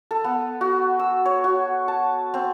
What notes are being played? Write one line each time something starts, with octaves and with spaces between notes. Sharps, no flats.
A4
B3
F#4
E6
C#5
F#4
A5
C4